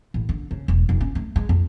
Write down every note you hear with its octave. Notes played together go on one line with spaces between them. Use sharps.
A1
D3
C#3
E1
F1
C#4
A3
G#3
F2